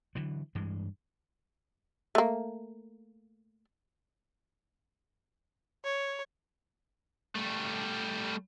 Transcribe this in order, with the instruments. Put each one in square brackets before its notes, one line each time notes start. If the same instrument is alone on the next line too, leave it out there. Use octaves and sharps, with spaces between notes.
[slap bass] D3 E3 F#3
G2 E3 G#3
[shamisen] A3 A#3
[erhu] C#5
[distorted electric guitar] G3 A3